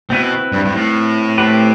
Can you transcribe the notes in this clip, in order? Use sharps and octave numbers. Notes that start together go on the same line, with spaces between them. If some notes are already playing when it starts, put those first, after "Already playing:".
B2 C4 E4 B4
G2
G2
A2
A3 C4 G4 B4